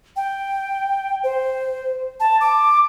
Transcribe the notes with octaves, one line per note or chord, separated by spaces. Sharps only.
G5
C5
A5
D6